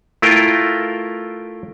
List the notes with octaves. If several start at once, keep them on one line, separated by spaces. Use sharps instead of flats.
A3 E4 F4 A#4 G5